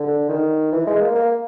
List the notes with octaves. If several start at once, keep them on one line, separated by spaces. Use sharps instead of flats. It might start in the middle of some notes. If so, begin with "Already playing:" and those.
Already playing: D3
D#3
E3
G#3
A#3
A#3